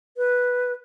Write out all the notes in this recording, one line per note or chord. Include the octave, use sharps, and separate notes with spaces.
B4